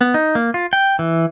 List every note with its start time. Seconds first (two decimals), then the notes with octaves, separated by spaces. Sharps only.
0.01 B3
0.14 D#4
0.35 A#3
0.54 F4
0.73 G5
0.99 E3